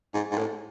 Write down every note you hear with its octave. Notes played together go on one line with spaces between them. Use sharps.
G#2
G#2
A2